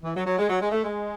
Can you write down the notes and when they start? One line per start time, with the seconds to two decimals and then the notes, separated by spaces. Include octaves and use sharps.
0.03 E3
0.16 F#3
0.26 F#3
0.38 G#3
0.50 F#3
0.61 G#3
0.72 A3
0.83 G#3